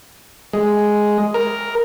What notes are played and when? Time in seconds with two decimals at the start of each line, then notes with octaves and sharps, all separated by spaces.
0.53 G#3
1.34 A#4